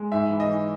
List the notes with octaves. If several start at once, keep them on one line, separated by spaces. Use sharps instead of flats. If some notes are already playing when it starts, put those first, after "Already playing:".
Already playing: G#3
G#2 E5
E3
D#5
E3